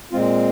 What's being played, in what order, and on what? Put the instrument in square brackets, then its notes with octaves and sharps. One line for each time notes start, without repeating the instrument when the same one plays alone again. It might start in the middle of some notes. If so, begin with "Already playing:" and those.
[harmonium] A#2 G#3 C4 F4